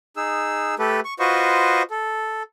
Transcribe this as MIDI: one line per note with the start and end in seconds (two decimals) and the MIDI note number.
0.17 0.75 63
0.17 0.75 68
0.17 0.75 88
0.79 1.00 57
0.79 1.00 67
0.79 1.00 69
0.79 1.00 71
1.05 1.14 85
1.19 1.83 65
1.19 1.83 66
1.19 1.83 71
1.19 1.83 72
1.19 1.83 75
1.19 1.83 85
1.90 2.43 69